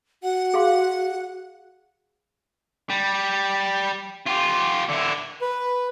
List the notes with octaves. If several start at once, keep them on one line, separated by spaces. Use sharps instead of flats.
F#4 F#5
G#4 F5 C6
G3
F4 G4
D3 E4
B4